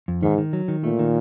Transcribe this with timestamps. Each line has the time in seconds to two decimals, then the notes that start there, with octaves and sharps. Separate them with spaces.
0.08 F2
0.22 G#2 D#3
0.38 D#3
0.53 F#3
0.68 D#3
0.84 A#2 A3
0.99 D#3